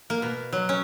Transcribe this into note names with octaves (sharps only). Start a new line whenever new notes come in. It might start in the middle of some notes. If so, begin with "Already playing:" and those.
A#3
B2
F#3
C#4